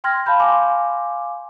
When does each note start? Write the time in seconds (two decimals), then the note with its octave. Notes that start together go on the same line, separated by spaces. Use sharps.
0.04 G5 C6 F6 G#6 A#6
0.26 F5 A5 B5 G6
0.40 F5 G#5 C6 D6